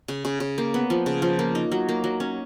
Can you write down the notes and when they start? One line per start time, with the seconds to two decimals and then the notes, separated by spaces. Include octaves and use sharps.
0.08 C#3
0.25 C#3
0.40 C#3
0.58 A#3
0.74 B3
0.90 F3
1.06 C#3
1.22 F3
1.39 A#3
1.55 D#4
1.72 F#3
1.89 A#3
2.04 F#3
2.20 C#4